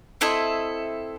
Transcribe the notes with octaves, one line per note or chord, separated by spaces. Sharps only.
C4 E4 A4 D#5